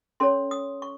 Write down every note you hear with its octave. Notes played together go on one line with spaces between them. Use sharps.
C#4 A4 C#5 C6
D#6
C#6